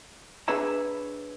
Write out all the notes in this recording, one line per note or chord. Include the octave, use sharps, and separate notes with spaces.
D4 G#4 B4 C#5 E5 A#5